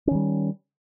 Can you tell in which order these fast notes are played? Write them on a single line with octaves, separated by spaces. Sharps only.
C#4 D#3 G3